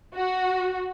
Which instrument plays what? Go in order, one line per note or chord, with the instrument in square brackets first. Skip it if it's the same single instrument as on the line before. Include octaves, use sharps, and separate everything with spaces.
[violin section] F#4